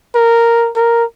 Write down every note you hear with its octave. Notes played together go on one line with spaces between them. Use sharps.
A#4
A#4